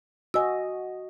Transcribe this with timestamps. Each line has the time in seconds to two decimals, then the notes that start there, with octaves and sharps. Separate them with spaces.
0.34 F#4 D#5 G#5 E6